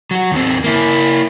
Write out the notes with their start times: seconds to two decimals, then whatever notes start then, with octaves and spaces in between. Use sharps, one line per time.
0.11 F#3 F#4
0.32 D#2 C4
0.64 A#3 E4